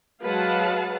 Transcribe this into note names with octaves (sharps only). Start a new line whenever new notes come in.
F#3 G#3 B4 F5 F#5 A5